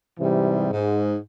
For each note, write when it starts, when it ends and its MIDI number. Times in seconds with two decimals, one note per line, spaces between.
0.19 0.69 44
0.19 0.69 48
0.19 0.69 52
0.19 0.69 55
0.72 1.15 44